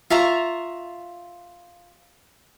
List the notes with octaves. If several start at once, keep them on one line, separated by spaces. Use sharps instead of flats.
F4 E5 A#5 C#6